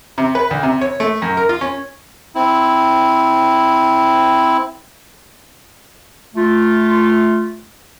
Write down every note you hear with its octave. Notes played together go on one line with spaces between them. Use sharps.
C3
B4
D2
C3
C#5
A3
F#2
A#4
F4
C#4
C4 E4
A3 F4